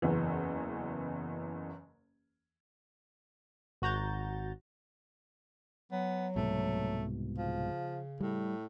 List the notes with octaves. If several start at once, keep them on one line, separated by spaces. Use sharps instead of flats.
F#1 E2 E3
G#1 F#4 A#5 G6 A6
F#3 B3
C2 G#2 B2 A3
C#3 F3
A2 G3